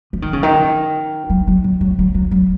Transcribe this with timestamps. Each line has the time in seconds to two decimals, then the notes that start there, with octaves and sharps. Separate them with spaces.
0.13 F3
0.22 D#3
0.33 C#3
0.43 D#3
1.30 F#3
1.47 F#3
1.64 F#3
1.81 F#3
1.99 F#3
2.15 F#3
2.31 F#3